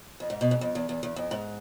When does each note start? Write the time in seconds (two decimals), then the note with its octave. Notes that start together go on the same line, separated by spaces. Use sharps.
0.20 F2
0.30 G#2
0.41 B2
0.51 G#2
0.61 F2
0.75 E2
0.89 E2
1.03 E2
1.16 F2
1.31 G#2